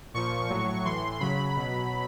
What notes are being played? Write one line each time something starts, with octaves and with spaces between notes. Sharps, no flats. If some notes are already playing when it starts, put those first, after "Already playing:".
A#2 F3 C#6
A2 F#3
A2 E3 C6
C#3 F#3 B5
B2 F#3